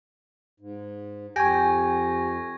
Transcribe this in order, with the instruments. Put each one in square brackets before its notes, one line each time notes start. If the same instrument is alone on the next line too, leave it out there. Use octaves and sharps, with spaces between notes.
[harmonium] G#2
[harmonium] F2 [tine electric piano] G4 G5 [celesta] G#5 [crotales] C#6 G#6 A#6